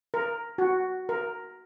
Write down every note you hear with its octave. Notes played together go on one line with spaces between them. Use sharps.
A#4
F#4
A#4